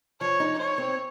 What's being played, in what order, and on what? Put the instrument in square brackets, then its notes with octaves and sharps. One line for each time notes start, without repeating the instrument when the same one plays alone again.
[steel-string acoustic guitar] F3 [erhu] C#5
[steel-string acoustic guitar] D#4
[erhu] C#5
[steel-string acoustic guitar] C4